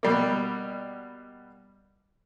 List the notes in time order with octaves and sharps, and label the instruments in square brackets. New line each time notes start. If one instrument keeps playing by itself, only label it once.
[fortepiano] B2 G3 A#3